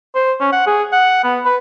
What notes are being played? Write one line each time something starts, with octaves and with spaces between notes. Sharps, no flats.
C5
C#4
F#5
G#4
F#5
B3
B4